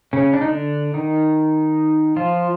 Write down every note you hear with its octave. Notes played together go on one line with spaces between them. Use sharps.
C#3 C#4
D4
D#4
D3 D4
D#3 D#4
F3 F4